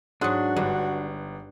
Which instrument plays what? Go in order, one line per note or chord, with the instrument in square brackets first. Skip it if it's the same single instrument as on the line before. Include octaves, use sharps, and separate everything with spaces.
[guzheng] G#2 F#3 [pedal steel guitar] D4 [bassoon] F#4 [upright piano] C6 D#6 F#6
[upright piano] G1 [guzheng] G2